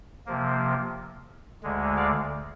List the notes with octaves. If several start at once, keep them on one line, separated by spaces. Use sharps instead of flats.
C3 F3 A#3
D2 D3 G#3
D5 F5